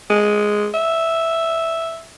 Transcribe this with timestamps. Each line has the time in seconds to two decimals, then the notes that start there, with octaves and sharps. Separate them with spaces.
0.10 G#3
0.74 E5